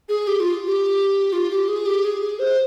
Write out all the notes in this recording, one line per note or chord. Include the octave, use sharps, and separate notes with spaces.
G#4
G4
F4
G4
F4
G4
G#4
G4
G#4
G#4
C5